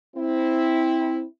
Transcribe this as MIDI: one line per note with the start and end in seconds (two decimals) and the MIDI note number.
0.16 1.25 60
0.16 1.25 64